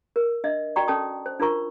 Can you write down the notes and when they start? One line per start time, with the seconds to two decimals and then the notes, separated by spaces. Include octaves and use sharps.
0.16 A#4
0.44 D4 D#5 E5
0.76 F#4 D5 G5 A#5 C#6
0.88 C#4 A4 G5 A5 D#6
1.26 C5
1.40 D4 F4 A#4 A#5 C#6